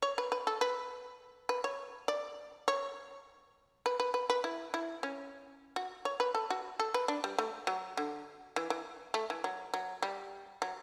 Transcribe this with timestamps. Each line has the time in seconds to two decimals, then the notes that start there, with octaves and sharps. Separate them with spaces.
0.02 C#5
0.18 B4
0.32 B4
0.47 A4
0.61 B4
1.49 B4
1.64 C#5
2.08 D5
2.68 C#5
3.86 B4
4.00 B4
4.14 B4
4.30 B4
4.44 E4
4.74 E4
5.03 C#4
5.76 F#4
6.05 C#5
6.20 B4
6.35 A4
6.50 F#4
6.79 A4
6.94 B4
7.08 D4
7.24 G3
7.38 A3
7.67 F#3
7.97 D3
8.56 E3
8.70 E3
9.14 A3
9.30 E3
9.44 F#3
9.74 F#3
10.03 G3
10.62 F#3